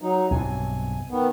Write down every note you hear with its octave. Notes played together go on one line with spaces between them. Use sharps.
F#3 D#4
B1 G2 C3 G#5
D#3 B3